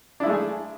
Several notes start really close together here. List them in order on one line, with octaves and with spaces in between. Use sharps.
D4 E4 G#3 A3 G#4